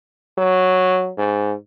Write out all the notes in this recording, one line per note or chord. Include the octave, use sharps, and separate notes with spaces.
F#3
G#2